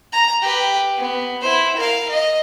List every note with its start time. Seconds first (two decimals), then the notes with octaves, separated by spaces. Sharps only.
0.13 A#5
0.42 G4 B4
0.97 B3
1.42 E4 C5
1.77 A#4 F5
2.09 D#5